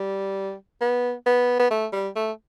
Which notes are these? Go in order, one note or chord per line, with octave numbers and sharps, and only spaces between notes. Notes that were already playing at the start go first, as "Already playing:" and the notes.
Already playing: G3
B3
B3
B3
A3
G3
A3